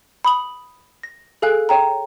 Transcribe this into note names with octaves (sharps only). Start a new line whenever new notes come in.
B5 D#6 F#7
A#6
G#4 A4 F5 G#5 F#6
C#5 G5 A#5